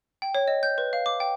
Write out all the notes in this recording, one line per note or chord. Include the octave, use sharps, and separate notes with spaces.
G5
C#5
D#5
G6
B4
F5
D6
G5